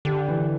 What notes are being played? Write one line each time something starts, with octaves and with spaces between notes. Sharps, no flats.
D3 G4
E3